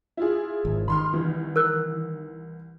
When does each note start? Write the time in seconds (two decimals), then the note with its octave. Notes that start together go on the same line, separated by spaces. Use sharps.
0.17 E4 F4 G#4
0.65 G#1
0.88 D#3 B5 C6 F6
1.13 C2 E3
1.56 A#4 E6 F#6